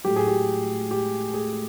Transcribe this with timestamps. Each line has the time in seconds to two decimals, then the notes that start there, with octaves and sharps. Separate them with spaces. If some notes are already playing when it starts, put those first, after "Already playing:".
0.04 A2 F#3 G4
0.16 G#4
0.28 G4
0.91 G4
1.34 G#4